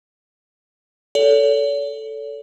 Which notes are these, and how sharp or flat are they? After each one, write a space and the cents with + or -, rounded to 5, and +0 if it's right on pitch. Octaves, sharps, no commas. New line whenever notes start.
A4 +0 C#5 +45